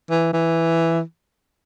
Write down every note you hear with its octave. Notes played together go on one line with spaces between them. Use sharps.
E3
E3